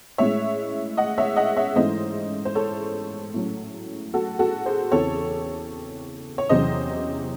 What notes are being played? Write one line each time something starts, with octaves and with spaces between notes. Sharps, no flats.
A2 G#3 C#4 C#5 E5
D#5 F#5
C#5 E5
D#5 F#5
C#5 E5
G#2 E3 A3 C#4 C5 D#5
C5
A4 C#5
A2 F#3 C#4
F#4 A4
F#4 A4
G#4 C5
E2 C#3 E3 C4 A4 C#5
C#5
E2 C3 F#3 C#4 C5 D#5